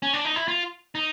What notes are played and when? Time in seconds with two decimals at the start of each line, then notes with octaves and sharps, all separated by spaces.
0.02 C#4
0.14 D4
0.25 D#4
0.36 E4
0.48 F4
0.95 D#4